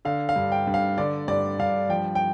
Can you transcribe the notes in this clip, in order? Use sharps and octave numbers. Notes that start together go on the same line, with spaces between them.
D3 F5
F5
G2
G5
G2
F5
D3 D5
G2 D5
G2 F5
F3 G5
G5